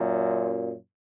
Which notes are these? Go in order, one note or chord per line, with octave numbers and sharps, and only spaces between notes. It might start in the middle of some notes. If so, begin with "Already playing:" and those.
Already playing: F#2 A#2